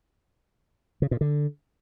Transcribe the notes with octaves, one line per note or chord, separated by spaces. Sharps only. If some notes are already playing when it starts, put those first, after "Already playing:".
C#3
A#2
D3